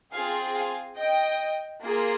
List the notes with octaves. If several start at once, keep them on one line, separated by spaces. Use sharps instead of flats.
C4 F4 G#4 F5 G#5
F5 G#5
D#5 G5
A#3 F4 G#4